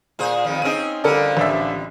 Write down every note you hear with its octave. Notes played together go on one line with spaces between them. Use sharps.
A#2 G#4 C5
F2 D#3 F3
C4 C#4 D#4 G#4 D#7
F2 D3 G3 A4 A#4 D5
A1 D4 E5